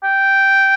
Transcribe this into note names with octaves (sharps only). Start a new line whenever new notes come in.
G5